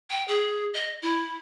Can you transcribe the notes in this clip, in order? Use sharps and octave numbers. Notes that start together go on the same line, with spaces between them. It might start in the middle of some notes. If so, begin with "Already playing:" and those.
G5
G#4
D#5
E4